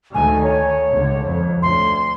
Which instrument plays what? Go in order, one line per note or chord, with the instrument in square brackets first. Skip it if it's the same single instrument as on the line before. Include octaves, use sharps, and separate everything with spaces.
[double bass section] D2 D#3 A3 [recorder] G#5
[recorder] C#5
[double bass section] C#2 D3
F2
[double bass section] D2 [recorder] C6